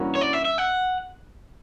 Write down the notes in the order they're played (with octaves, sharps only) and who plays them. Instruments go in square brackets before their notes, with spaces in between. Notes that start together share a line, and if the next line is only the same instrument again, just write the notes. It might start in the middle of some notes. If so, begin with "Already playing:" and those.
Already playing: [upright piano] G2 E3 A#3 C#4 F#4
[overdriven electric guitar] C#5
D5
E5
E5
F#5